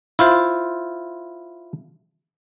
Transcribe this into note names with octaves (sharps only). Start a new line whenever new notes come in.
E4 F4 C5